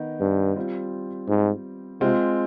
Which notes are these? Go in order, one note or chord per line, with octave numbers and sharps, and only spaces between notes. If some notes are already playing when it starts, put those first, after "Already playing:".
Already playing: D#3 B3 D#4
G2
G3 C4 F4
G#2
C3 G#3 C4 F4